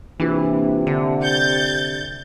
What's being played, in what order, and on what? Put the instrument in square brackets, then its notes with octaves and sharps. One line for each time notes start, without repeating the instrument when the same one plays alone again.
[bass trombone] C3 [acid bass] E3 [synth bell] A#3 D4 F4
[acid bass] D3 [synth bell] E5
[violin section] G6 A6 [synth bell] C#7